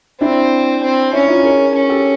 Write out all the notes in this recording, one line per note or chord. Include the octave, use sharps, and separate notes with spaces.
C4 D4 E4
C4
C#4 D4 E4
D#4 F4
G#4 A#4
C#4
G4 A4